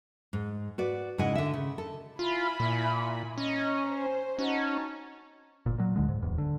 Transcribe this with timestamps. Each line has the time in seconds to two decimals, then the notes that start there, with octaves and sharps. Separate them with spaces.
0.33 G#2
0.78 F#4 B4 D5
1.18 G#2 C#3 E4 D#5 F#5 G#5
1.35 D3 E5
1.54 C#3
1.78 A4
2.19 E4 F4 G#5 B5
2.60 A#2
3.38 C#4 D#5 A#5
3.88 C5
4.39 C#4 D#4 F#4 A5
5.66 G1 A#2
5.78 A#2 F#3
5.96 D2 D3 G#3
6.09 G#2
6.22 D1 E2
6.38 D3